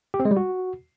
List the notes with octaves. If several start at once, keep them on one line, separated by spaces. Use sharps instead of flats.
G4
C4
G#3
G3
F#4